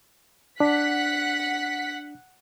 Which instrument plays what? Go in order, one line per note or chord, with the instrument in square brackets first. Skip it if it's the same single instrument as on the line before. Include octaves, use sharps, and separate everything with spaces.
[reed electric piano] D4 [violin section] F#5 F#6 B6